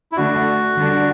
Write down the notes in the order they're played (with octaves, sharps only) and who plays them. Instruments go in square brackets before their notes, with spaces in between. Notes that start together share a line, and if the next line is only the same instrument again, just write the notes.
[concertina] E4
[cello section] D3 A3 D4 [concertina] F#4
[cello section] D3 G3 D4